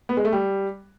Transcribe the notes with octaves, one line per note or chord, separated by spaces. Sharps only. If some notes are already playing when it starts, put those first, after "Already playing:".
B3
G#3
A3
G3